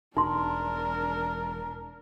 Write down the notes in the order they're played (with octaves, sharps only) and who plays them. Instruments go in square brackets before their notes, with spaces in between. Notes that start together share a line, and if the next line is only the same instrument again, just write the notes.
[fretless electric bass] E1 [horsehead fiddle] D4 A#4 [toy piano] D#4 C6